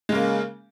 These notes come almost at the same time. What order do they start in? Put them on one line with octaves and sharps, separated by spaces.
G#3 C#3 A#3